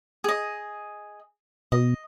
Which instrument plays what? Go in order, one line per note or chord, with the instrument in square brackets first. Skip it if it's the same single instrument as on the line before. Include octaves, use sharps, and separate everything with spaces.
[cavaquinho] G#4 D#5
[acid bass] B2 [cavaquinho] D#5